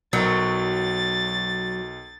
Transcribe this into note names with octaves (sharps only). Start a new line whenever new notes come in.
B1 F#3 A#4 A6